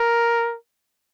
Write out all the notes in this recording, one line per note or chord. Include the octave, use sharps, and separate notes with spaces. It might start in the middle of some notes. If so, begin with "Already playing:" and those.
Already playing: A#4